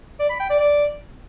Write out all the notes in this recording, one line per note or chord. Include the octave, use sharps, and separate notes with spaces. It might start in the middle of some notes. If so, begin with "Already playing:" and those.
D5
B5
G5
D5
D5